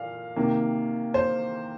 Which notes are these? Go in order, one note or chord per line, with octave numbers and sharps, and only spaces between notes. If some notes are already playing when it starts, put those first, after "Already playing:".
Already playing: A#2 F5
C3 D#3 A#3
C5